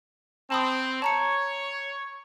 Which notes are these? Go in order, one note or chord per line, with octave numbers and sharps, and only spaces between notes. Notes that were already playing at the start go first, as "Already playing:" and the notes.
C4 A5 B5 D#6
C#5 A5 A#5 C#7